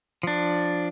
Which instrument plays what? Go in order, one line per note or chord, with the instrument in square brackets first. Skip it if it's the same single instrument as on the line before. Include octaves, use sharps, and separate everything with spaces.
[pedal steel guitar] F3 D4